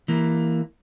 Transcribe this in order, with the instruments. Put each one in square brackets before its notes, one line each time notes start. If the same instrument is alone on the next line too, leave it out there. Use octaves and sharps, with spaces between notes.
[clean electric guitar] E3 A#3